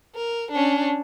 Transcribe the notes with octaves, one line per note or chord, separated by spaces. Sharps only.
A#4
C#4 D4